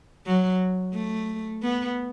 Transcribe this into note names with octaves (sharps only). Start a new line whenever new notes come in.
F#3
A3
B3